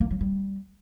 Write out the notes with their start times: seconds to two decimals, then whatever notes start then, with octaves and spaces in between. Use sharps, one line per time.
0.01 A#3
0.11 F#3
0.21 G3